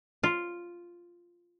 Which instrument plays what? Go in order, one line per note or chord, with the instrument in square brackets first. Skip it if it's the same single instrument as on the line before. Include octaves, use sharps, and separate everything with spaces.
[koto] F4